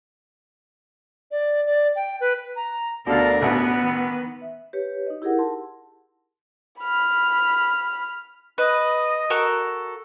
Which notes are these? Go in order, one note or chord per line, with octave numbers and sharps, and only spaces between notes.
D5
D5
G5
B4
A#5
D2 B2 D3 A4 A#4 D5 F5
A1 B2 B3 B4 F#5
D#3
E5
G4 B4 C#5
D#4 D#5
E4 G4 G#4 A#4 F#5
A5 C6
B5 F6
B4 D#5
F#4 A4 A#4